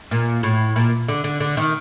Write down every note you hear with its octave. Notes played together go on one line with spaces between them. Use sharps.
A#2
A2
A#2
D3
D3
D3
D#3